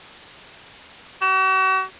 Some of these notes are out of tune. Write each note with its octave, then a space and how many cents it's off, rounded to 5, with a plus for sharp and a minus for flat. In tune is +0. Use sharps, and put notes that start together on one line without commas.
F#4 +40